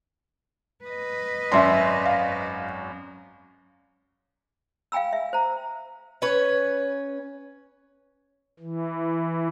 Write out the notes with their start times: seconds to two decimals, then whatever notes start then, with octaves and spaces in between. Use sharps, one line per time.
0.84 B4 D#5
1.52 G#1 F#2 E5 C6
2.05 F5
4.92 F5 G5 G#5 B5 E6
5.13 E5
5.33 C5 A#5
6.22 C#4 B4 C#5
8.60 E3